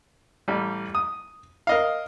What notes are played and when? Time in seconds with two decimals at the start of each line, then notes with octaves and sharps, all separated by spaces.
0.48 A1 G3
0.95 D#6
1.67 A#4 D#5 F5